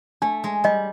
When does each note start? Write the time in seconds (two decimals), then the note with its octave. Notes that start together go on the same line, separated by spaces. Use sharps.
0.22 A3 D4
0.44 G#3
0.64 G3 D#5